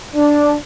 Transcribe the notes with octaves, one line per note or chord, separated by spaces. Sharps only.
D4